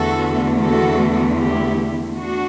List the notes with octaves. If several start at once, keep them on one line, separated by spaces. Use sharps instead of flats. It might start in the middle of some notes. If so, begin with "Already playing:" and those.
Already playing: E2 D3 A3 F#4 A4
F#4 A4
E4 G4
D4 F#4